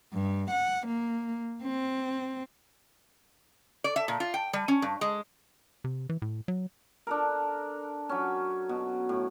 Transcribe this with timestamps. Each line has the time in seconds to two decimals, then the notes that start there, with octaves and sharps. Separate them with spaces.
0.13 G2
0.51 F#5
0.87 A#3
1.63 C4
3.84 D5
3.96 E5
4.08 A#2
4.20 F4
4.34 G5
4.53 G3
4.68 C#4
4.82 G2
5.01 G#3
5.84 C3
6.09 E3
6.22 A2
6.48 F#3
7.07 D4 A4 A#4
8.09 F#3 C#4
8.69 B2
9.09 A2